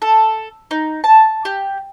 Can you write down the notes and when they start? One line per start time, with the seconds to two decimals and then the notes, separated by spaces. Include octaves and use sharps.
0.02 A4
0.71 D#4
1.04 A5
1.45 G4